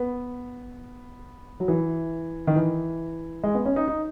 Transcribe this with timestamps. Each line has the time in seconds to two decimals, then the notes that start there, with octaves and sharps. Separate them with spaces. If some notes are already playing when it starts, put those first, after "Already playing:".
Already playing: B3
1.60 F#3
1.68 E3
2.47 D#3
2.56 E3
3.43 G#3
3.55 B3
3.65 C#4
3.76 D#4
3.88 D#4